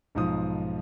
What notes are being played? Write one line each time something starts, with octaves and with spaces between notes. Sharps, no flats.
B1 G#2 F3 D#6